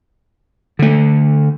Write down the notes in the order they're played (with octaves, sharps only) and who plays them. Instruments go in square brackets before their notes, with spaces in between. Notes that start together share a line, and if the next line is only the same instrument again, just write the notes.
[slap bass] D3 A3